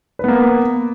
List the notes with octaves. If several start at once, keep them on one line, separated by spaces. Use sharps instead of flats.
A#3 B3 B4